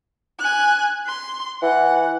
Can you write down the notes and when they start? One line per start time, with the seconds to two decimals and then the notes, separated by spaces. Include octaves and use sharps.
0.40 G#5 F#6
1.07 C6
1.62 E3 F#5